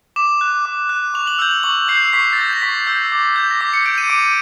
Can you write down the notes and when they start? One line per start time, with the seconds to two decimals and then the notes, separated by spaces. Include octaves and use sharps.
0.16 D6 E7
0.41 F#6
0.65 D6
0.89 F#6
1.14 C#6 F7
1.27 F#7
1.39 E6 G6 F#7
1.51 F#7
1.63 C#6 F#7
1.88 E6 G6 C7
2.09 C7
2.13 C#6 B6
2.33 A6
2.38 E6 G6 A#6
2.53 A#6
2.62 C#6 B6
2.87 E6 G6
3.12 D6
3.36 G6
3.51 A#6
3.60 D6 B6
3.73 C#7
3.86 G6 D7
3.98 D#7
4.10 D6 D7